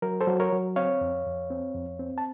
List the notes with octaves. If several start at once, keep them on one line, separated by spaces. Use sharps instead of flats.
F#3 A#4
A4 C5
F#3
A#4 C#5
F#3
C4 C#5 F5
F2
F2
C4
F2
C4
A5